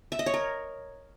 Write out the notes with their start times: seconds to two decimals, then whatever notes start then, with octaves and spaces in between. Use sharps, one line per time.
0.12 E5
0.19 D#5
0.26 C#5
0.34 A#4